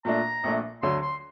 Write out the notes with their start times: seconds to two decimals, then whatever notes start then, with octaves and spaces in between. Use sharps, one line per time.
0.05 A#2 A3 D4 A#5
0.44 A#1 A#2 A3 D4
0.82 D2 D3 F#3 C6
1.02 C6